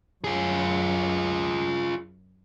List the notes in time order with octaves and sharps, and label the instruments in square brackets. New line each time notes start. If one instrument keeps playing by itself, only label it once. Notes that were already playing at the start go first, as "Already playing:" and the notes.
[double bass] F#2 [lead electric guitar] F4 G#4